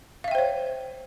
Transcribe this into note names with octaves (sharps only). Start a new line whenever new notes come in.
C5 C#5 E5 F5 G5